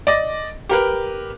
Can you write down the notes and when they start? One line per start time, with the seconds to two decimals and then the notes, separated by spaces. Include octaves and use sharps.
0.07 D5 D#5
0.69 G4 A#4 B4